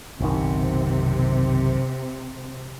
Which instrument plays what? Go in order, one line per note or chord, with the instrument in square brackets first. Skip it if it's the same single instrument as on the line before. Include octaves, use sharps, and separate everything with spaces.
[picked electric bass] F#1 B1 D#3 [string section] C3